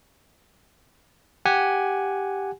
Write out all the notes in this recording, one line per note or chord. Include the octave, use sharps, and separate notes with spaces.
G4 F#5 G#5